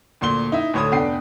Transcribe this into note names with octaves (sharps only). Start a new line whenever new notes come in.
D2 A#2 C6 G7
D#4 E4 E5
D2 A2 C#5 B5 D#6
F1 B3 D4 G5 C7